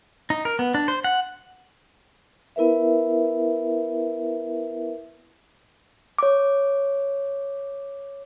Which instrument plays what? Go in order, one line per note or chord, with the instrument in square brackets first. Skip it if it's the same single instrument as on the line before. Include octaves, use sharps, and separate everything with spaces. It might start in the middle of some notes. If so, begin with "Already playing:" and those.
[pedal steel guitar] D#4
A#4
B3
D4
C5
F#5
[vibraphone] B3 E4 A#4 B4 E5
[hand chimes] C#5 D6